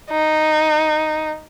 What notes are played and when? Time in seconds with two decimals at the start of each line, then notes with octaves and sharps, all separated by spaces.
0.11 D#4